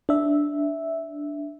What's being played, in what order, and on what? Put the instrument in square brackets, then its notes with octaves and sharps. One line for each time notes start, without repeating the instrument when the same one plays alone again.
[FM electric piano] D4 E5